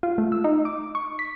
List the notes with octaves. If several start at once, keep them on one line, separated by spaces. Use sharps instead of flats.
F4
A3
E6
D#4
D6
C#6
B6